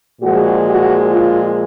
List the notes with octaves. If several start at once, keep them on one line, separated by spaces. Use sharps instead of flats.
A#2 F3 G#3 F#4
F#4
F4